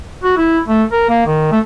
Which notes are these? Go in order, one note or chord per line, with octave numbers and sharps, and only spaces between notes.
F#4
E4
A3
A#4
A#3
D#3
A3